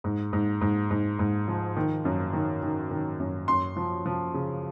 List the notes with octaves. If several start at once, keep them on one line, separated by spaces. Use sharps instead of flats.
G#2
G#2
G#2
G#2
G#2
F3
D#3
F#2
D#3
D#3
D#3
F#2
F#2 C6
F3
F3
C#3